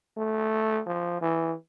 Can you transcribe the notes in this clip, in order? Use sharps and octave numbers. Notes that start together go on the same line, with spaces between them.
A3
F3
E3